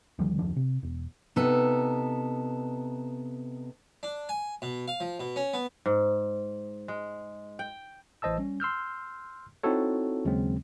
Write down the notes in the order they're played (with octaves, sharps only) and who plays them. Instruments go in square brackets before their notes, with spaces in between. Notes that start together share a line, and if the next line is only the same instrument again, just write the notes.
[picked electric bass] D2 D#3 F3 G3
F#1 D#2 F3 D4
C3
E1
[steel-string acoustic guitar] C3 B3 D#4 A4
[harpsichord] D4
G#5
B2
F5
F3
B2
C#4
B3
[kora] G#2
G#3
G5
[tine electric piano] A1 E3 C5 D#5 A5 E6
G3 C#4
C6 E6 F6 G6
C4 D#4 E4 F#4 A4 C#5
D#2 C#3 F#3 G#3 C4